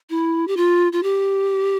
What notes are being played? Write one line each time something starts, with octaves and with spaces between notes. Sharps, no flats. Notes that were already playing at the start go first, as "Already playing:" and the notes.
E4
G4
F4
F4
G4